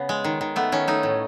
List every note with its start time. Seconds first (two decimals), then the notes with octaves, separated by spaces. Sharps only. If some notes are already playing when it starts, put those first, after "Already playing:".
Already playing: C#3 B3
0.09 G#3
0.24 D#3
0.41 D#3
0.56 A3 B3
0.72 D#3 C#4
0.88 A3 D#4
1.03 A2